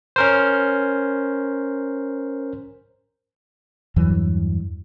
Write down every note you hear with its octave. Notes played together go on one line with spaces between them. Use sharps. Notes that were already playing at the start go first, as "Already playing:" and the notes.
C#4 A#4 C5
E2 G2 E3 F#3